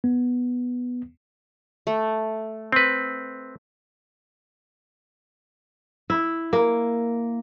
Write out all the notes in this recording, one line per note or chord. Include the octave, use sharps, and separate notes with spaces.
B3
A3
C4 B4
E4
A#3